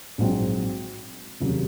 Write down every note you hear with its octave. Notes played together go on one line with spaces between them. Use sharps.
A#1 G#2 F#3 C4
F1 D#2 C#3 F#3